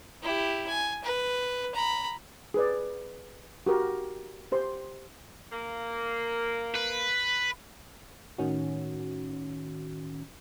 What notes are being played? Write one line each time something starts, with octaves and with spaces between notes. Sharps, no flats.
E4 G4
G#5
B4
A#5 B5
G#4 B4 D5
F#4 G4 A#4
G4 C5 C6
A#3
B4
A2 D#3 C#4 F#4